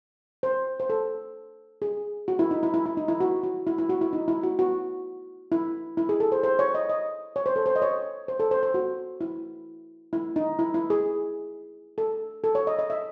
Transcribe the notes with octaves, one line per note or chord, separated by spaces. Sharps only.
C5
C5
A4
G#4
F#4
E4
D#4
E4
E4
E4
D#4
E4
F#4
F#4
E4
E4
F#4
E4
D#4
E4
F#4
F#4
E4
E4
G#4
A4
C5
C5
C#5
D#5
D#5
C#5
C5
A4
C5
D#5
C#5
C5
A4
C5
C5
F#4
E4
E4
D#4
E4
E4
G#4
A4
A4
C#5
D#5
D#5
E5